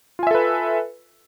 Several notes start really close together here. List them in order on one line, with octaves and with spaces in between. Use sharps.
F4 G#5 E5 A4 B4